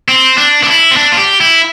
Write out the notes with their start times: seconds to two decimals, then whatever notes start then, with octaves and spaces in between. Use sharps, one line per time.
0.08 C4
0.38 D4
0.63 D4
0.66 E4
0.91 C4
0.97 D4
1.12 F4
1.18 G4
1.41 E4